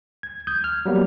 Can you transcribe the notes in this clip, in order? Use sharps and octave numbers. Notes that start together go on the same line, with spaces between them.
G#6
D#6 G6 G#6
F6
F#3 G3 A#3 B3